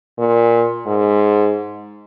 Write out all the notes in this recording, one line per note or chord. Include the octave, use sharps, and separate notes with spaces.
A#2
G#2